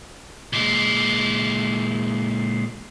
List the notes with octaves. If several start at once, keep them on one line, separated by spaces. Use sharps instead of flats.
A#2 G#3